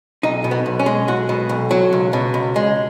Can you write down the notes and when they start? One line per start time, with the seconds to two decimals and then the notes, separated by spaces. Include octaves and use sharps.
0.23 B1 D#4
0.44 B2
0.51 B3
0.66 B1
0.79 C#4
0.86 G#3
1.08 B1 F#4
1.29 B2
1.49 B1
1.71 F#3
1.93 C#2
2.13 B2
2.34 C#2
2.56 G#3